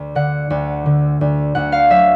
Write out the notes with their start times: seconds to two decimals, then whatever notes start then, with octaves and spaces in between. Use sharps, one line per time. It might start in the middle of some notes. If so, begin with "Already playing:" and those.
Already playing: D2
0.15 D3 F#5
0.50 D2
0.86 D3
1.21 D2
1.55 D2 F#5
1.72 F5
1.90 F#3 E5